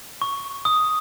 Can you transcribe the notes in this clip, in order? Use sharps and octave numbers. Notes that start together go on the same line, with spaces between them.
C#6
D#6